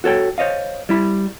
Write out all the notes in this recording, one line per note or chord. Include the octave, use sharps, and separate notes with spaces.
F#4 A4 C#5 G5
C5 C#5 D#5 F5
G3 E4 B5